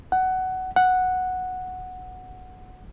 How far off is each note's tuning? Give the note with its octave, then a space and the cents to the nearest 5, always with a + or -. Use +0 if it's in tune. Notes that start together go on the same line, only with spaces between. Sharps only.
F#5 +15
F#5 -5